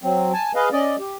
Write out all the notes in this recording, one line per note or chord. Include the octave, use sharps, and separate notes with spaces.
F#3 C4
G#5 A5
G#4 B4 D#5 F5
C#4 D5 D#5
G4